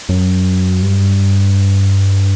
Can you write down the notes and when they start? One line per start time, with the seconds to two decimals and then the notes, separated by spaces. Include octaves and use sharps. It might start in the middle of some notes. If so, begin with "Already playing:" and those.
0.09 F#2
0.82 G2